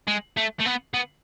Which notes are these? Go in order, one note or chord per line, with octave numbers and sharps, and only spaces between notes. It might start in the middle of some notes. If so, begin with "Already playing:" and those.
G#3
A3
A3
B3
B3